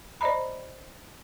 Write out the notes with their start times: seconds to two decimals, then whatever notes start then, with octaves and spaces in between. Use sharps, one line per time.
0.21 C5 D5 D#5 A#5 B5